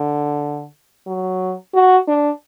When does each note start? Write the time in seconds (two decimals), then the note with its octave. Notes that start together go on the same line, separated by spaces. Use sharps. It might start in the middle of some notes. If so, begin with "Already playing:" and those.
Already playing: D3
1.07 F#3
1.74 F#4
2.08 D4